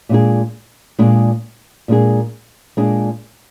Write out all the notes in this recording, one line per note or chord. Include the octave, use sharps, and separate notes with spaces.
A#2 G#3 D4 G#4
A#2 G#3 D4 G#4
A#2 G#3 D4 G#4
A#2 G#3 D4 G#4